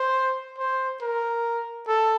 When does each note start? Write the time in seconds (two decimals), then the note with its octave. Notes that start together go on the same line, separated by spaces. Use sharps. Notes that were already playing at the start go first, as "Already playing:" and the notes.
Already playing: C5
0.58 C5
1.02 A#4
1.87 A4